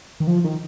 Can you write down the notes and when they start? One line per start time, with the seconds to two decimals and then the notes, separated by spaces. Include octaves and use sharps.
0.20 D#3
0.27 F3
0.44 D#3